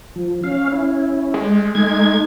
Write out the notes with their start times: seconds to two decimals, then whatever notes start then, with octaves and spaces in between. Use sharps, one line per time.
0.16 F3
0.44 C#4 F5
0.72 C#4 E4
1.34 G#3
1.75 G#3 A3 D#4 G#6